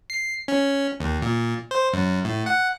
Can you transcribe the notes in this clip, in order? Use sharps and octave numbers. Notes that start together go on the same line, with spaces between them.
C7
C#4
D#2
A#2
C5
F#2
A2
F#5